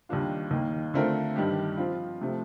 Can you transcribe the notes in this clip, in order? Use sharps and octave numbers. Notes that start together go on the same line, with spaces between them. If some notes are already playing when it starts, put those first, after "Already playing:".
D#2 D#3 G3 D4 F4
D#2 D#3 A#3
D3 A3 C4 F4 A#4
G2 D#3 G3 D4 G4
F3 C4 F4
C3 F3 A3 C4